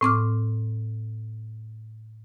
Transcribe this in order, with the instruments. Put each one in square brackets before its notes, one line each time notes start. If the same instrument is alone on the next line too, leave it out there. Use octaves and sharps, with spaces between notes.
[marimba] A2 C4 D6 F6